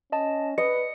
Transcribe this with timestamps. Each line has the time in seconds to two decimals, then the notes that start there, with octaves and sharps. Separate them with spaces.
0.12 C#4 D#5 A5
0.58 B4 D#5 C#7